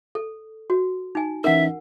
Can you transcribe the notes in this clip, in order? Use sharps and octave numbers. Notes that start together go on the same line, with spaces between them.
A4
F#4
D#4 G#5
E3 C#4 D#4 A#4 E5 F#5